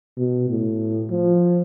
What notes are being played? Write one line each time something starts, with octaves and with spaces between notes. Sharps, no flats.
B2
A2
F3